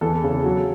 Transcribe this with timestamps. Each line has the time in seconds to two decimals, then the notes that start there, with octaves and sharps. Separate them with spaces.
0.01 E2 A4
0.24 C#3
0.44 F#3